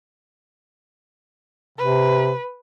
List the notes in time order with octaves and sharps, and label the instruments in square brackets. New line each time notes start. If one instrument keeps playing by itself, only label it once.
[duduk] C3 [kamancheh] B4